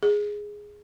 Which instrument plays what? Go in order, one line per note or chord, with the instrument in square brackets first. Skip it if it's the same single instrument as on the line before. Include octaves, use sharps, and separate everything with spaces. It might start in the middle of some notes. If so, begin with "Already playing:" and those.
[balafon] G#4